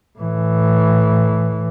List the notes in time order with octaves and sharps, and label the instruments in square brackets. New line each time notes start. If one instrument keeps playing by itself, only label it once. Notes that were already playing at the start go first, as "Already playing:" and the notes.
[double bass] A2 E3